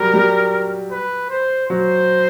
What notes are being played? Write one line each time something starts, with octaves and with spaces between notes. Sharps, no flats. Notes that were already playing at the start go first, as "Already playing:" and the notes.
Already playing: F#3 G3 A#4
G3
B4
C5
F#3 C5